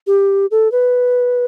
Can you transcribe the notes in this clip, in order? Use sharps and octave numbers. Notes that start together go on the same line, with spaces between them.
G4
A4
B4